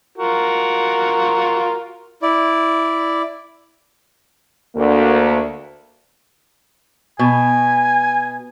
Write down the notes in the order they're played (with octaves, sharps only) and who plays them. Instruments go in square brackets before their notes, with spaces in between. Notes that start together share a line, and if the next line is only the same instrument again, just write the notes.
[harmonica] F4 F#4 A#4
[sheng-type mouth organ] E4 D5
[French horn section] D2 A#3
[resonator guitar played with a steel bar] B2 [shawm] G#5